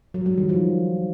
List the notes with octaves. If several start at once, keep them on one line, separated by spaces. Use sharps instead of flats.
F#3
G3
D#3
F3